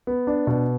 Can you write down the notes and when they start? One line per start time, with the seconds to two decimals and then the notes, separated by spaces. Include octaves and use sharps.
0.07 B3
0.27 D4
0.47 B2